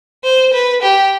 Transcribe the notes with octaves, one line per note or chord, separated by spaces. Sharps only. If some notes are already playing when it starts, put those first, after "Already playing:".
C5
B4
G4